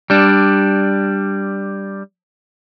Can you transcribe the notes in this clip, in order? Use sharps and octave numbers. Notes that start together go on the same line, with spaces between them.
G3 D4